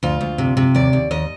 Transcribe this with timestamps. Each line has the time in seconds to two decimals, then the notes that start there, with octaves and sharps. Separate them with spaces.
0.03 D2 F4
0.21 D2
0.38 C3
0.57 C3
0.75 D#2 D5
0.93 D#2
1.11 D#2 D#5